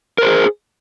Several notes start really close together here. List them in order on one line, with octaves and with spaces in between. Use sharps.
A#4 C5 G#4